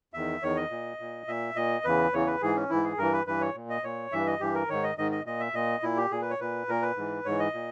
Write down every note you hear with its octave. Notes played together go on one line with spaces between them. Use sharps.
E2 D#3 E5
E2 D#3 C#5
D#5
A#2
A#2
A#2 E5
A#2 D#5
E2 C#3 E3 B4
E2 C#3 E3 C#5
B4
G#2 E3 G#4
C#4
G#2 E3 E4
G#4
G2 E3 A#4
B4
G2 E3 B4
C#5
A#2
D#5
A#2 C#5
G2 E3 E5
D#5
G2 E3 G4
A#4
G#2 D#3 C#5
D#5
G#2 D#3 D#5
D#5
A#2 D#5
E5
A#2 D#5
A#2 E4
G4
A#2 G#4
B4
C#5
A#2 B4
A#2 A#4
B4
G#2 E3
G#2 E3 C#5
D#5
A#2